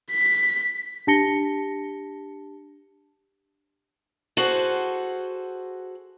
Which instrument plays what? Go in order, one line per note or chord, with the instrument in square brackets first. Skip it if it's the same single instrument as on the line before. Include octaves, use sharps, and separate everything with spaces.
[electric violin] B6
[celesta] D4 G4 A5 A#6 C#7 G7
[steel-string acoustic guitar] F#4 G#4 A4 C5 F#5